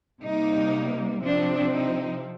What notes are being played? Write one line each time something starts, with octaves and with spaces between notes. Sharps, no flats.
C3 G3 A#3 D#4
C3 F3 C4 D4
D#4